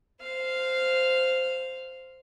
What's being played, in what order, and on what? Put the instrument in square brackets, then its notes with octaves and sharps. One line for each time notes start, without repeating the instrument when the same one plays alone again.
[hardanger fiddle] C5 F5